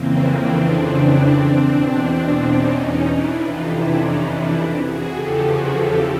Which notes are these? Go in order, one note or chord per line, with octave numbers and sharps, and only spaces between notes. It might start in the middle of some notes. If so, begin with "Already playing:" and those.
Already playing: F2 C#3 E3 A#3 C4
C4 D4
E2 B2
C#4 D#4
C#4 D#4
D4 E4
F2 C3 E3 D#4 F4
D4 E4
C#4 D#4
D4 E4
F#4 G#4
E2 C#3 F3 G4 A4
F#4 G#4
G4 A4